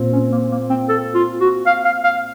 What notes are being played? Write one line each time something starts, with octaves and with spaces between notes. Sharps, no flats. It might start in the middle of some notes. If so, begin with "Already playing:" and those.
Already playing: A#2 C4
C#4
A#3
A#3
C4
A4
F4
F#4
F5
F5
F5